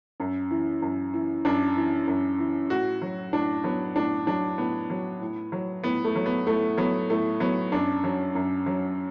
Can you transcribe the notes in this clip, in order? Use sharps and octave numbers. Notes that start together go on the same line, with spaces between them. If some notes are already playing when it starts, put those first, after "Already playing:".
F#2
E3
F#2
E3
F#2 D4
E3
F#2
E3
A2 F#4
F#3
A2 D4
F#3 B3
A2 D4
F#3 D4
A2 B3
F#3
A2
F#3
A2 B3
A3
F#3
B3
A2 A3
F#3 B3
A2 A3
F#3 B3
F#2 D4
F#3
F#2
F#3